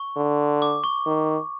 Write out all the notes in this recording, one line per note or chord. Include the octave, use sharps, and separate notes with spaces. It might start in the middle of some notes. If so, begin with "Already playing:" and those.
Already playing: C#6
D3
D6
C#6
D#3